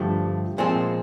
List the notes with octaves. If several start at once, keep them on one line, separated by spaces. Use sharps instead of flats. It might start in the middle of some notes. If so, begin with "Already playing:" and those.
Already playing: G2 D3 F3 A3
A#2 F3 G#3 C4